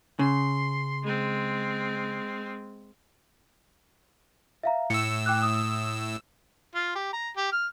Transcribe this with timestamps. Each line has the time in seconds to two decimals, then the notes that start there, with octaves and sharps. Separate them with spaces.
0.19 C#3 C6
1.04 G#3 C4
4.63 E5 F5 A#5
4.90 A2 E6 C#7
5.26 G5 D6 F#6
5.42 D#6
6.75 F4
6.95 G4
7.13 A#5
7.37 G4
7.52 F6